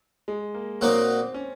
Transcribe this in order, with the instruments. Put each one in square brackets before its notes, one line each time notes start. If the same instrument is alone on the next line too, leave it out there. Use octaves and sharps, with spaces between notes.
[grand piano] G#3
A#3
[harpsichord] A#2 F#3 A#3 D#4 [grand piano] C4
[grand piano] C#4